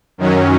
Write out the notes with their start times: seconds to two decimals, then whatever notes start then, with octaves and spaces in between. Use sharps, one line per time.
0.18 F#2 D#3 F#3 C#4